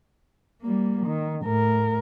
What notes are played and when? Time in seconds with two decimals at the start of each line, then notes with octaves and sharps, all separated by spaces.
0.62 G3 A#3
1.06 D#3
1.45 A2 A#4